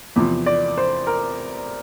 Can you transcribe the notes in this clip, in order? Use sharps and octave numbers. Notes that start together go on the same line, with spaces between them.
E2 C3 F3
D5
C5
A#4